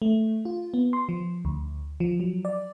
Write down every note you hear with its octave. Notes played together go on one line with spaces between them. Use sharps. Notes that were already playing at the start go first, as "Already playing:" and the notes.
A3
F4
B3
C6
F3
D2
F3
F#3
D5